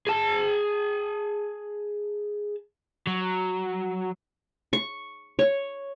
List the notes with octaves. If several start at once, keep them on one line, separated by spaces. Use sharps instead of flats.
G#4 A5
F#3
C#6
C#5